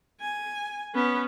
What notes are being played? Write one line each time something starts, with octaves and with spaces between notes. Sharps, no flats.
G#5
B3 C#4